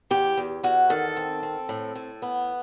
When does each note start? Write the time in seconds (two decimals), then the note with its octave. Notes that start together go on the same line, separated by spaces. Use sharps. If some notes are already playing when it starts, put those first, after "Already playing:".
0.10 E2 G4
0.38 E2
0.63 E2 F#4
0.90 D#3 A4
1.17 C4
1.43 C4
1.69 A2
1.95 A2
2.22 B3